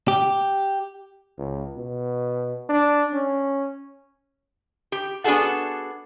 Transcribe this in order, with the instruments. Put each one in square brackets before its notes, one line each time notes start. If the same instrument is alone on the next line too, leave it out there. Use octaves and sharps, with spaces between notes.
[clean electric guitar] G4
[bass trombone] C#2
B2
D4
C#4
[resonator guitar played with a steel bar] G4
B3 D4 F#4 G#4 A4 F#5